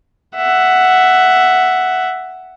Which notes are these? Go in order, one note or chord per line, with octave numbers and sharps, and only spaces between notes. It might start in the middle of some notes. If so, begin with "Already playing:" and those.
E5 F#5